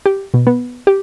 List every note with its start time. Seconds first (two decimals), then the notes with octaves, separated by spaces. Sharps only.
0.06 G4
0.34 B2
0.47 B3
0.87 G4